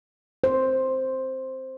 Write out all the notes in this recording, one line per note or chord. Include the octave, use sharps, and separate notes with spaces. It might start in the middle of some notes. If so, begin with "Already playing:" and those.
C5